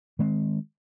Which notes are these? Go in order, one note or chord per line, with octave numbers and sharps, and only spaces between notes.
D#3 G#3 C4